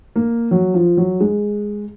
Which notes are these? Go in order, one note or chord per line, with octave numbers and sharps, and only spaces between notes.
A#3
F#3
F3
F#3
G#3